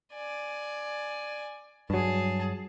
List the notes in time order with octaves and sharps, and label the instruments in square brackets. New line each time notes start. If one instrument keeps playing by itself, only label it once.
[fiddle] D5 G#5
[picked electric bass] G2 F#3 [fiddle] G#4 A5